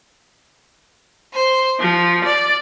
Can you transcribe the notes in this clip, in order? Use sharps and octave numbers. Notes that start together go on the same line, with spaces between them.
C5
F3
D5